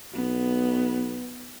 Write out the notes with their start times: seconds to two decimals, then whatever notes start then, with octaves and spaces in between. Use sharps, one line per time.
0.14 B1 B3